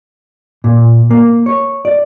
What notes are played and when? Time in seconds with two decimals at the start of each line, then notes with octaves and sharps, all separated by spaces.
0.64 A#2
1.11 A#3
1.46 C#5
1.85 D5